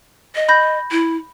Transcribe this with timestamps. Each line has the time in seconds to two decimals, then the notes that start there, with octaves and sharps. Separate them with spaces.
0.35 D#5
0.48 B5 G6 A#6
0.91 E4